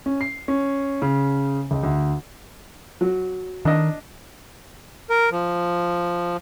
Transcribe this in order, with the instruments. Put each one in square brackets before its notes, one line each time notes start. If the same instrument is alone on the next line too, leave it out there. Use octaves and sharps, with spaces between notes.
[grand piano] C#4
C7
C#4
C#3
C#2
D2
[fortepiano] F#3
[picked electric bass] D#3 [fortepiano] D4 D#5
[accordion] A#4
F3